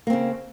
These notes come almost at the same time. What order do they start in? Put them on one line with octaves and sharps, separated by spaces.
A#3 C4 C#3